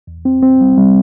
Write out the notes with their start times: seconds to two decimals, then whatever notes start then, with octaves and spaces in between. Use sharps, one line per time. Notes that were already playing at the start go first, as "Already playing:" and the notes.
0.07 E2
0.25 C4
0.43 C4
0.61 G3
0.78 G3